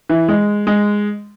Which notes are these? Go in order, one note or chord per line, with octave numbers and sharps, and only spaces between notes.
E3
G#3
G#3